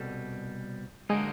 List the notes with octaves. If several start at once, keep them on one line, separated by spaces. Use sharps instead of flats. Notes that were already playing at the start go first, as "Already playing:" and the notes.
Already playing: C2 B2 G3 A4
D3 F#3 G#3 A#3 D#4 G#4